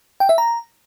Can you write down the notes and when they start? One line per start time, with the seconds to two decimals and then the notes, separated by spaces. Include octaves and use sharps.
0.20 G5
0.29 E5
0.38 A#5